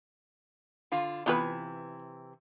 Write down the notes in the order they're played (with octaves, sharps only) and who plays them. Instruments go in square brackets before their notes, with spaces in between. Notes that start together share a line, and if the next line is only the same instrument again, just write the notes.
[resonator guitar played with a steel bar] D3 F4
[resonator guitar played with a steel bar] C3 E3 [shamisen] B3 F4 B4